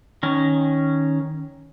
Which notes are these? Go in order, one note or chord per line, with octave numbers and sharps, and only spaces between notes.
D#3 C#4